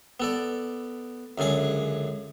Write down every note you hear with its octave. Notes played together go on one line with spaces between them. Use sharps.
B3 A4 D5
C#2 F#2 D3 G#4 G#5